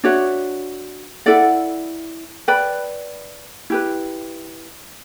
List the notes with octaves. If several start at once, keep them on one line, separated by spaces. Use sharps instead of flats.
D4 F#4 C#5 E5
E4 A4 D5 F#5
B4 D5 G5 B5
E4 G4 B4